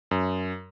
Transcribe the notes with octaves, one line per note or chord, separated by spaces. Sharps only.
F#2